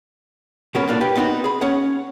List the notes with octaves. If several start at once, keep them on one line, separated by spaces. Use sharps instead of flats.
B2 G#3 B3 C#4 F#4 A#4
A2 A#3 D4 F4
G4 B4
B3 C4 D#4 F#4
G#4 B5
C#4 C#5 F#5